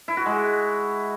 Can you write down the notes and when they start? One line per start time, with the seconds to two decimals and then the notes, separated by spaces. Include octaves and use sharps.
0.08 E4
0.17 F#4
0.26 G#3